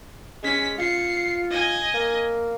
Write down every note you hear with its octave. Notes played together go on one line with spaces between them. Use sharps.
G#3 C#4 B6
F4 C7 C#7
D#5 G#5
A#3